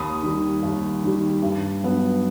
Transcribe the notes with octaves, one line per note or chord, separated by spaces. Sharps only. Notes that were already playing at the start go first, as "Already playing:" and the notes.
Already playing: D#2 B5 D#6
D#3 G3
D#2
D#3 G3
G2
F#3 B3